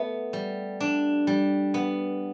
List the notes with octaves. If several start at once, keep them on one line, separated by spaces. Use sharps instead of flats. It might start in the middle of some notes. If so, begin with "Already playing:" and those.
Already playing: A3 B3
G3
D4
G3
B3